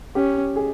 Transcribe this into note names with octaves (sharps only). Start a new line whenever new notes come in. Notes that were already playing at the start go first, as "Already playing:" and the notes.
C#4 G4
G#4